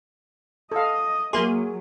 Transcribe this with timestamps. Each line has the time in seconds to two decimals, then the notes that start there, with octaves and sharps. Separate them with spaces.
0.72 A4 D#5 F5
1.33 F#3 A#3 G#4 E5 C6 D6